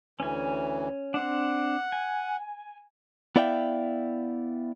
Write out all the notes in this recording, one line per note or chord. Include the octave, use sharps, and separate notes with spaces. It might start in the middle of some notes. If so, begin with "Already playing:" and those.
D2 E3 C#4 G#5
C4 D4 F#5
G#5
B3 E4 D5 E5 F5 G5